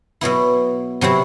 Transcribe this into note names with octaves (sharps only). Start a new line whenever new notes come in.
B2 F#3 B3 E4
C3 F#3 C4 E4